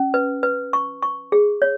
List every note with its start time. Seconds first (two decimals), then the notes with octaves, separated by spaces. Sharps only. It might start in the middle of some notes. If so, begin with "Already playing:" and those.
Already playing: C#4
0.14 B4
0.43 B4
0.73 C#6
1.03 C#6
1.32 G#4
1.62 C#5